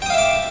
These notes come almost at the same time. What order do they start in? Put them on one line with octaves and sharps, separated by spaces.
G5 D#6 F5 E5 D6